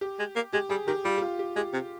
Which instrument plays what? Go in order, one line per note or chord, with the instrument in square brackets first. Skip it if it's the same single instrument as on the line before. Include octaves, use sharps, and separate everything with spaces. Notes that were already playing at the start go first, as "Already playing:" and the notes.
[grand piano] G4
[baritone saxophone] G#3
A#3
[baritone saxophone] G#3 [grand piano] G4
[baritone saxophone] G3 [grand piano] G#4
[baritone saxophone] D#3 [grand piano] G4
[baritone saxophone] G3 [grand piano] F4
[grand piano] G4
F4
G4
[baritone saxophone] G#3 [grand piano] G4
[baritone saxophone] C3